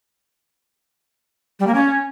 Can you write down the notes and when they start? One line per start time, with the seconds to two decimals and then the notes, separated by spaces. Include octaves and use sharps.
1.59 G3
1.67 A#3
1.74 C#4